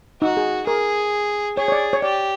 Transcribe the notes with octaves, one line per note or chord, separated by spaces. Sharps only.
D#4 F#4
G#4
G#4 A#4
G#4 C#5
C#5
D5
C#5
G4 D5